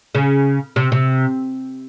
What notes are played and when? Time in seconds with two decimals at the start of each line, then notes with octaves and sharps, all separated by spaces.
0.15 C#3
0.76 C3
0.92 C3